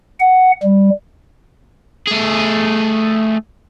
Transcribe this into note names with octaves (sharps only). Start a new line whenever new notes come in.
F#5
G3
A3 G#4